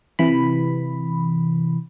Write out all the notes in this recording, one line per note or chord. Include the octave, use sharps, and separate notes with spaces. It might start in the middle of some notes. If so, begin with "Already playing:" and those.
C3 E3 B5